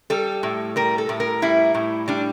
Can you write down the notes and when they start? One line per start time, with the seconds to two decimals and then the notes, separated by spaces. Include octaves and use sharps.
0.10 G3 A4
0.43 A2
0.76 G3 A#4
0.98 A4
1.09 A2
1.20 A#4
1.42 G3 E4
1.74 A2
2.08 G3 D4